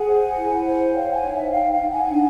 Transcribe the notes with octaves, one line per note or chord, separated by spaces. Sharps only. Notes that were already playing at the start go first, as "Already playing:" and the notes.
Already playing: G#4 F#5 G#5
C5
E4
C5
C#5 F5 G5
F#5 G#5
D#4
E5 F#5
D#4 F5 G5
F5 G5
D#4
F#5 G#5
D4